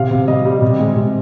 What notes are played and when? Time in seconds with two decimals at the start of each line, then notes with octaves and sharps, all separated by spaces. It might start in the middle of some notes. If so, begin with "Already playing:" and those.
Already playing: C3 F5
0.10 C3
0.28 G3 D#5
0.45 G3
0.62 C3
0.79 G#3
0.96 C3